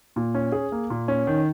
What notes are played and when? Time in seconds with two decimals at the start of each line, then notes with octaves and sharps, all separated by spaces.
0.16 A#2
0.35 C#4
0.52 G#4
0.72 A#3
0.90 A#2
1.08 C#4
1.27 D#3